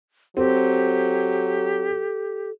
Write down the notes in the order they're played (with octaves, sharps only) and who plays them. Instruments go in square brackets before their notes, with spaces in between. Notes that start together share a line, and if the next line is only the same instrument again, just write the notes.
[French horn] F#3 [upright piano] C4 [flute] G4 [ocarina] A4